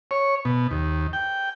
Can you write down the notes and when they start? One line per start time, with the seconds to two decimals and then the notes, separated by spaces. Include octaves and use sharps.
0.11 C#5
0.45 B2
0.71 D#2
1.13 G5